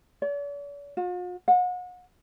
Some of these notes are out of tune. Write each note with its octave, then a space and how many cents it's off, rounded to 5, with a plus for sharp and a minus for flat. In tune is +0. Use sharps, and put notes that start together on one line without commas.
D5 -45
F4 +45
F#5 -35